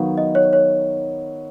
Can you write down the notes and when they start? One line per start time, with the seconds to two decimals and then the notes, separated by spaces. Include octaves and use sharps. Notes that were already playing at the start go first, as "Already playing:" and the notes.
Already playing: D#3 F#3 B3 F#4 F5
0.18 D#5
0.35 C#5
0.53 C#5